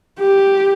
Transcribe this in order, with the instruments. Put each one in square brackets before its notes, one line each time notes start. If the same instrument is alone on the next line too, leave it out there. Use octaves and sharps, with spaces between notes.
[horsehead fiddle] G4